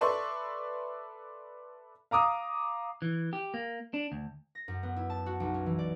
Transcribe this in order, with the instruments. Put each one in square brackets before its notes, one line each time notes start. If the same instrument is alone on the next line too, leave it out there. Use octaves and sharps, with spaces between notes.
[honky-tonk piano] A4 B4 D5 E5 C6 C#6
[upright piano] F5 A#5 D6 D#6
[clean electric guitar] E3
G4
A#3
D4
D2
[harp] A#6
F#2
B3
E4
A5
F#4
B1
C#4
E3
D5